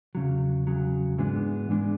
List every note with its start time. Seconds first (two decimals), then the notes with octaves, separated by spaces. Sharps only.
0.15 E2 C#3 F#3
0.67 E2 C#3 F#3
1.18 G#2 E3 G#3 B3 D4
1.69 G#2 E3 G#3 B3 D4